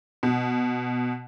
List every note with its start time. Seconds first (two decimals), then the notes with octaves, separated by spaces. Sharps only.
0.23 B2